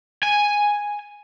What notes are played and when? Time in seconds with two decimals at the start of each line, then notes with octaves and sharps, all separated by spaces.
0.23 G#5